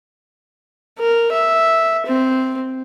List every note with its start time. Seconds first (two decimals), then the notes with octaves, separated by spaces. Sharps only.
0.99 A#4
1.32 E5
2.06 C4